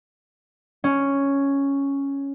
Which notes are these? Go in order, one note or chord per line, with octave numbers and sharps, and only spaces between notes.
C#4